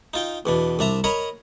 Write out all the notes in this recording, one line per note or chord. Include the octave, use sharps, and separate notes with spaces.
D#4 F4 G5
E2 B2 D4
C2 D4 E5 A#5
A#4 C#5 D#5 A#5 B5